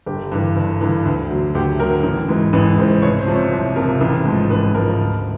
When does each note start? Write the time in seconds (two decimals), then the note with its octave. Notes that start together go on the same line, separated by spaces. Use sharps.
0.06 G1 G4
0.32 G2 E3
0.56 G1
0.81 G2 E3
1.05 D2
1.30 D3 F#3
1.55 D2 G4
1.79 D3 F#3 A#4
2.03 A1
2.28 G#2 E3
2.53 A1 B4
2.78 G#2 E3 C5
3.02 C2 C#5
3.19 C5
3.27 C3 F3
3.35 C#5
3.52 C2
3.76 C3 F3 A#4
4.01 A1
4.25 G#2 F3
4.50 A1 B4
4.75 G#2 F3 A#4
5.00 D2